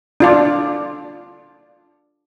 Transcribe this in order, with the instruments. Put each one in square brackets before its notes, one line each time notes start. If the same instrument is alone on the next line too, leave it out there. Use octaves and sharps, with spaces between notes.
[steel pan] D4 F4 D5